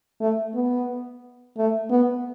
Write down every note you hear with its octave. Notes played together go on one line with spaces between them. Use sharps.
A3
B3
A3
B3